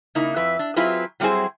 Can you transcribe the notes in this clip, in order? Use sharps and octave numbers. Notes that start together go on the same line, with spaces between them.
C#3 A#3 D#4 E4
F2 B4 E5
D4
F#3 C4 E4 F4 G#4 B4
F#3 G3 C4 E4 G#4 C5